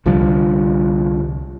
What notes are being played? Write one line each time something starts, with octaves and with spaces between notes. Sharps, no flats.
C2 D3 F3 G3